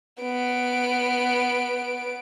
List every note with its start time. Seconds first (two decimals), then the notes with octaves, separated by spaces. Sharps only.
0.22 B3 D7